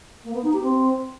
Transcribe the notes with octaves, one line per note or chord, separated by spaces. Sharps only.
A#3
B3
D#4
G4
C4